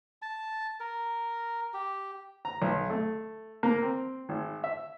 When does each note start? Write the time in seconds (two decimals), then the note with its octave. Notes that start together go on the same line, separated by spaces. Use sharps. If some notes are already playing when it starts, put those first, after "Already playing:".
0.22 A5
0.80 A#4
1.74 G4
2.45 A#5
2.62 B1
2.90 A3
3.63 A#3
3.82 C4
4.29 G#1
4.64 E5